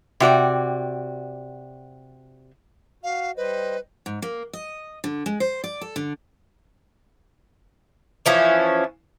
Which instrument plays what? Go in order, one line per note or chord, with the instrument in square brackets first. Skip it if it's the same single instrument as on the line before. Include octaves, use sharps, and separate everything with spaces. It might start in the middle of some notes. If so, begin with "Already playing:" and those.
[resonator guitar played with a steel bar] C3 F#4 D5 G5
[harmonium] F#4 [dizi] F5
[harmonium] G3 C5 D#5 [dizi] B4
[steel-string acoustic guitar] G#2
A#3
D#5
D3
G#3
C5
D5
A4
D3
[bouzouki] E3 F3 C#4